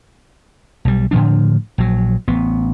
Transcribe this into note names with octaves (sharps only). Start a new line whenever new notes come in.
B1 G3
A2 D3 F3 D4
A#1 F#3
A1 B3